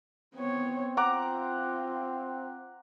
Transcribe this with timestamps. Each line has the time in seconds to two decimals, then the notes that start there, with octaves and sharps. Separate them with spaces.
0.35 B3 C4 C#5
0.97 F4 F#5 A#5 D6